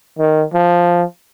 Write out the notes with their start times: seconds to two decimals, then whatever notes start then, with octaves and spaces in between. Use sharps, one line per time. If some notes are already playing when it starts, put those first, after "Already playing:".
0.19 D#3
0.53 F3